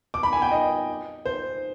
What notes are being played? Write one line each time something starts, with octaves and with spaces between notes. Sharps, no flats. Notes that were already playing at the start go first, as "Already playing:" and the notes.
D6
B5
G#5
G5
D#5
C5